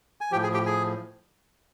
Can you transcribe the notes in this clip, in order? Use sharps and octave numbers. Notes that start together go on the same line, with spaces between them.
G#5
A2 F3 G4 G5
G#4 G#5
G4 G5
G#4 G#5